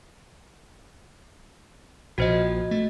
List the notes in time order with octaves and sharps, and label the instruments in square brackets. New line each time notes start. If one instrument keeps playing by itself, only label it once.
[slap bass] A#1 A#2 F3 [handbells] F#4 C5 D#5
[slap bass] A3